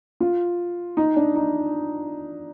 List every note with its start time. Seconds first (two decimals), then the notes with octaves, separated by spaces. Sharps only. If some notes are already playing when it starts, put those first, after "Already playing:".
0.20 F4
0.97 D#4
1.16 D4
1.36 D#4